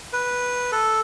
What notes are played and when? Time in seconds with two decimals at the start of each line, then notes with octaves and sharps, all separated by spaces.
0.13 B4
0.72 A4